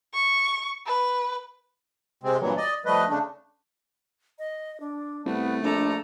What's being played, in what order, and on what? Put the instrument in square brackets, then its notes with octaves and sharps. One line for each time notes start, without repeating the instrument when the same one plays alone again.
[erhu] C#6
B4
[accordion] C3 G#3 C4
G2 A#2 E3 F#3
D5 D#5
F3 G3 A3 B4 D#5
C#3 A3 D4
[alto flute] D#5
D4
[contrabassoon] C2 [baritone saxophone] A3 [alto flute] B3
[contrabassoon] A#1 [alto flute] D4 [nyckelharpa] A4 A#5